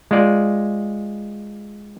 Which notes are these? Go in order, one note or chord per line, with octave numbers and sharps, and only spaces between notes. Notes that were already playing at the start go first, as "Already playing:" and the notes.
G#3 F4 D5